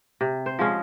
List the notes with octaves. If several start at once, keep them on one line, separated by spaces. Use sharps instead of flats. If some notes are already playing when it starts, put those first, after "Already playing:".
C3
C5
F3 G#3 C#4